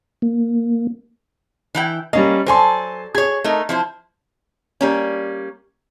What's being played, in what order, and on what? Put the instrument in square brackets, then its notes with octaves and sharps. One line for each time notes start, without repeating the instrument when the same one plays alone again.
[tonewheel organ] A#3
[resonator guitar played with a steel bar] E3 E4 G5
[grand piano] G3 C#4 D#5 [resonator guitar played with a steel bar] A#3
[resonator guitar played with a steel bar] F#3 A4 D5 [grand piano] C5 G#5 C6
[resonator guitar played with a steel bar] G#4 C#5 [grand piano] G#6
[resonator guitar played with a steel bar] A3 D#4 A#4
F3 E4 C5
G3 A#3 C#4